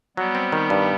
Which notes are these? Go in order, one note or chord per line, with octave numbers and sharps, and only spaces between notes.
F#3 G3 B3
C4
D#3
G2